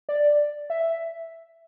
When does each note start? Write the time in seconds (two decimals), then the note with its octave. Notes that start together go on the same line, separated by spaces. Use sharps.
0.09 D5
0.70 E5